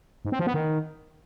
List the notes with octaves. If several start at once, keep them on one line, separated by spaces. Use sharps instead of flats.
G#2
C4
F3
B3
D#3